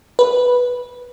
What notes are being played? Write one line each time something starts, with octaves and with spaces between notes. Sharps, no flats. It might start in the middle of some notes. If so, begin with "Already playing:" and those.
B4